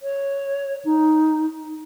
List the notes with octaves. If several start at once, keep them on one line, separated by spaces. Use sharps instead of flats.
C#5
D#4